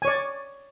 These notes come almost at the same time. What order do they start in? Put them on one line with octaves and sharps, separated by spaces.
G#5 C#5 D5